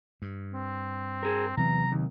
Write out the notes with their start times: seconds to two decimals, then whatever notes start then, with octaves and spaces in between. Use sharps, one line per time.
0.22 G2
0.53 C4
1.23 G#4 A#4
1.57 E2 C3 F#3 C4 A#5
1.92 D#2